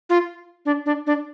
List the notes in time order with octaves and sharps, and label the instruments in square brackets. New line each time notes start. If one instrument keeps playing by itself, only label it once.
[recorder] F4
D4
D4
D4